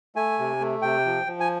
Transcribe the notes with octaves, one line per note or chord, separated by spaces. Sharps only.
A3 G#5
C3
A3
C3 G5
F3
F3
G#5